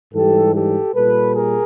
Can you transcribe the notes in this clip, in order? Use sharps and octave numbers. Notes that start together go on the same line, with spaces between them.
G#2 E3 G3 G4 A4
G4 A4
A#2 G3 A4 B4
G#4 A#4